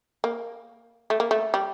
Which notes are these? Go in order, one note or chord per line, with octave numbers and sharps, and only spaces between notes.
A#3
A3
A#3
A3
G3